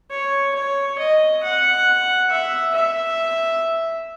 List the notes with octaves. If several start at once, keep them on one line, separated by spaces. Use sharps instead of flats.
C#5
C#5
D#5
F#5
E5
E5